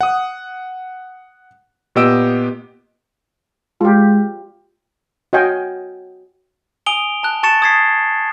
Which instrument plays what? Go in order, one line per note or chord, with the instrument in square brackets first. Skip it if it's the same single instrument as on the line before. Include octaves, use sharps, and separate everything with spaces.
[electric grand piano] F#5 D#6
A#2 B3 G4 D#5 E6 D7
[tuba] G#3 [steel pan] F4 G4
[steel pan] F#4 C#5 D#5 F5 G5 G#5
[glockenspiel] G#5 D#6 D7 F7 G7
A5 F#6
A5 C#6 A6 C#7 E7
D#6 G#6 A6 B6 C7